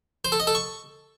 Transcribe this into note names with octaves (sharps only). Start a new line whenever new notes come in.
C5
A4
D#5
A4
C#6